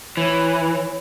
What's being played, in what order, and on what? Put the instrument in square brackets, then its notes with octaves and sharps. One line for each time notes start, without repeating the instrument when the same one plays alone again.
[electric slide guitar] E3 [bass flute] C#5